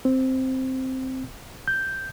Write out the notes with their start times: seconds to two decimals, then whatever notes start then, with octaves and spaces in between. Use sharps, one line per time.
0.05 C4
1.68 G6